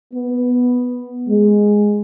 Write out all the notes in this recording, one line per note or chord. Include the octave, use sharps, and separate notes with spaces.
B3
G#3